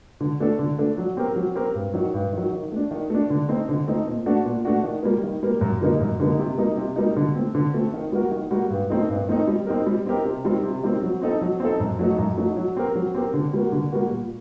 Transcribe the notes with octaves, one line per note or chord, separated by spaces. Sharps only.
D3
A3 D4 A4
D3
A3 D4 A4
F#3
C4 G4 A#4
F#3
C4 G4 A#4
G2
D#3 F#3
G2
D#3 F#3
D#3
A3 D4
D#3
A3 D4
D3
A3 C4 D#4
D3
A3 C4 D#4
A#2
A3 D4 F#4
A#2
A3 D4 F#4
D#3
G3 A#3
D#3
G3 A#3
F#2
D3 G3 A#3 D#4
F#2
D3 G3 A#3 D#4
C3
G3 A#3 D#4
C3
G3 A#3 D#4
D3
A3 C4
D3
A3 C4
D#3
G3 A#3 F#4 A#4
D#3
G3 A#3 F#4 A#4
G2
D#3 A3 C4 D#4
G2
D#3 A3 C4 D#4
G3
C4 D#4 G4 A#4
G3
C4 D#4 G4 A#4
C3
D#3 G3 C4
C3
D#3 G3 C4
F#3
C4 D#4 A4
F#3
C4 D#4 A4
F#2
F#3 A3 D#4
F#2
F#3 A3 D#4
F#3
C4 G4 A#4
F#3
C4 G4 A#4
D3
G3 A#3 F#4
D3
G3 A#3 F#4
A#2